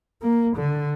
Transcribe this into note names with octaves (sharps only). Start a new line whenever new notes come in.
A#3
D3